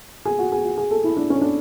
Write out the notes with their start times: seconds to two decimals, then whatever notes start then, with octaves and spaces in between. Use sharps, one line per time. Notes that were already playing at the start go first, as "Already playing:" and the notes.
0.25 G#4
0.39 F#4
0.52 G#4
0.65 F#4
0.78 G#4
0.91 A4
1.04 E4
1.17 D4
1.30 C#4
1.41 D4